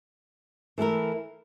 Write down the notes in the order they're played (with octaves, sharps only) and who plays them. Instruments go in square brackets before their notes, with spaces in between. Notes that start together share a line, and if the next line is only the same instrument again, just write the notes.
[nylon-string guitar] E3 A3 E4 A#4